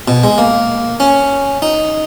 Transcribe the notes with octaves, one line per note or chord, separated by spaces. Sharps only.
B2
G#3
A#3
C#4
D#4